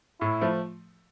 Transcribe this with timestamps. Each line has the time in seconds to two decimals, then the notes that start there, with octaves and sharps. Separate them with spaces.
0.21 A2 E4
0.41 F3 A3